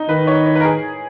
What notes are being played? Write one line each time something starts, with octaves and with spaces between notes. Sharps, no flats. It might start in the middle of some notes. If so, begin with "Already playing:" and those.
Already playing: D#4
D#3 B4
C#5
C#5
A#4 B4
G#4